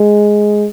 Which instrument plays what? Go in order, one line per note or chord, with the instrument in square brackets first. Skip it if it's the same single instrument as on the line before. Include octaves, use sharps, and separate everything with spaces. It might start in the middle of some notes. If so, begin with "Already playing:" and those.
Already playing: [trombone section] G#3